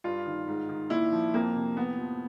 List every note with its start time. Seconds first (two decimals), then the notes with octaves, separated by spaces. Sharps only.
0.04 G2 F4
0.26 D#3
0.47 G#2
0.69 D#3
0.90 A#2 E4
1.12 F3
1.34 F2 A#3
1.55 C3
1.77 A2 B3
1.98 F3